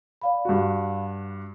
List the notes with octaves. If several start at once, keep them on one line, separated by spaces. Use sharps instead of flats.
D5 F5 B5
G2 F#4